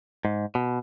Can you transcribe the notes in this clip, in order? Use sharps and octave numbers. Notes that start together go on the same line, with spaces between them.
G#2
B2